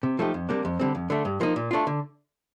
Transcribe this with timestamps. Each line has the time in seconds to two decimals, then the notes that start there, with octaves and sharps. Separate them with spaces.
0.03 C3
0.19 F3 A3 D#4 G4
0.34 F2
0.49 C3 G3 A#3 D4
0.65 F2
0.80 D3 G3 C4
0.95 F2
1.10 D3 A3
1.25 G2
1.41 F3 A#3 D#4
1.56 A#2
1.71 A3 D4 F4
1.87 D3